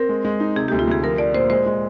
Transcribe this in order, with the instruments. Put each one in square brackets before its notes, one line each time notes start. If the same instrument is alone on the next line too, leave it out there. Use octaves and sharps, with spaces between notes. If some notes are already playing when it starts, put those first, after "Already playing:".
Already playing: [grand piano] C4 [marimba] A#4
[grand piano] G#3
G#3
D#4
[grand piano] C3 [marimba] G#4
[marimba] G4
[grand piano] D2
[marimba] F4
[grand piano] D2 [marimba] G#4
[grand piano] F3 [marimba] A#4
[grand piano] F3 [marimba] D5
[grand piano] A#2 [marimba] C5
[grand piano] G#3 [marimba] C5
[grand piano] G#3